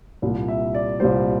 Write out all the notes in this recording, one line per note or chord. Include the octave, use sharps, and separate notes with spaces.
C2 A#2 G3
E5
D5
C2 A#2 G3 C5